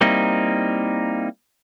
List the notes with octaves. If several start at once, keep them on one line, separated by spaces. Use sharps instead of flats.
G3 A#3 C4 D#4 E4